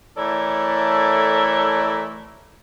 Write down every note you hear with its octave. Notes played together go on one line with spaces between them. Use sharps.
E3 A3 A4 A#4 C#5 D5